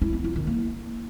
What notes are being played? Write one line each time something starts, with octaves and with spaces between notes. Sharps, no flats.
E4
B3
F4
D#3
A#3